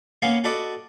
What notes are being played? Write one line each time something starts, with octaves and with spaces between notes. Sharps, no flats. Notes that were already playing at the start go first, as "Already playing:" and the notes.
A#3 B3 C#4 F5
F#4 A4 B4 D5 D#5